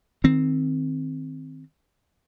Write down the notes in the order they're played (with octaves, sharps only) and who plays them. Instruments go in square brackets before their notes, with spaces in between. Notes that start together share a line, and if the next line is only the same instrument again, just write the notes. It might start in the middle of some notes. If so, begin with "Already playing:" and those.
[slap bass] D#3 C4